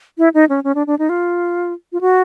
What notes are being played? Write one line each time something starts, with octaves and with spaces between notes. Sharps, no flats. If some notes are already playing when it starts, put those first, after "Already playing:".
E4
D#4
C#4
C#4
D4
D4
D#4
F4
F4
F#4